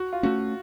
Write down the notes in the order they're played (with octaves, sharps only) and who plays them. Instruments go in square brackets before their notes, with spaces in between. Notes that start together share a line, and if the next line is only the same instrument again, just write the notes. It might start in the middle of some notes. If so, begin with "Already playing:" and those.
Already playing: [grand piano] F#4
F4
[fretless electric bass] A3 C#4 [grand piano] F#4